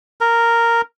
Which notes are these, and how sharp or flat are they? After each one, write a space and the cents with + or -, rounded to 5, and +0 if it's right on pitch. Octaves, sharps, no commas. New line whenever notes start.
A#4 -5